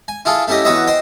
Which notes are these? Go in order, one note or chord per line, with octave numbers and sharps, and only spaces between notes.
G#5
E4 F4 G#4 A4
A3 C#4 E4 G4 D#5
E2 F#4 B4 C#5 D#5 E5
C5 D#5 G5